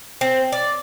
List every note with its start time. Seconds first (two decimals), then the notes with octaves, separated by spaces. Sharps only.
0.21 C4
0.52 D5